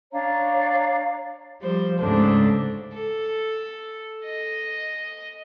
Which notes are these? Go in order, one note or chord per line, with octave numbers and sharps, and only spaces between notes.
D4 C#5 F5 A#5
F3 G3 C5
D2 G#2 C#3 D4 A4 C5
A4
D#5